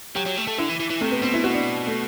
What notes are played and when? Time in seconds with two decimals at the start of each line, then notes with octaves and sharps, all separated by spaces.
0.15 F#3 G4
0.26 F#3
0.37 A3
0.47 A3
0.58 D3 E4
0.69 E3
0.80 E3
0.90 E3
1.01 C3 A3
1.12 B3
1.22 B2 C4
1.34 E4
1.44 F#4
1.54 D4
1.87 A3